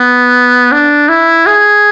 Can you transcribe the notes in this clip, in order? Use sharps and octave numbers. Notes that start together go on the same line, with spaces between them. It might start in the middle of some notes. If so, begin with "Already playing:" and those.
Already playing: B3
D4
E4
G#4